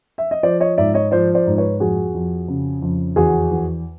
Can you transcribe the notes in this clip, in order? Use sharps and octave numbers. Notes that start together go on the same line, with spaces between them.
E5
D#5
F3 C5 D5
C#5 D#5
G#2 D5 E5
C#5 D#5
F3 C5 D5
C5 D5
G#2
B4 C#5
F2 F#4 G#4
F2
C#3
F2
E2 F#4 G#4
E2